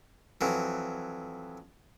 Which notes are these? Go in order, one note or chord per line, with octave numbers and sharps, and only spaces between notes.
F2 E3 F#3